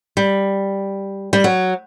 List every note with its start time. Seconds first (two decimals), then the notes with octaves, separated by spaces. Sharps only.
0.17 G3
1.33 G3
1.44 F#3